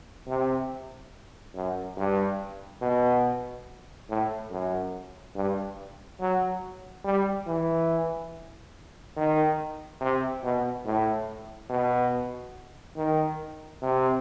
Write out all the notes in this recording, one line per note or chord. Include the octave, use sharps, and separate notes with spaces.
C3
F#2
G2
B2
A2
F#2
G2
F#3
G3
E3
D#3
C3
B2
A2
B2
D#3
C3